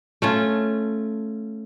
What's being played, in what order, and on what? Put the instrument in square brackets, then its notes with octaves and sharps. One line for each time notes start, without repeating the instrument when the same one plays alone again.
[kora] A3 C#4 F4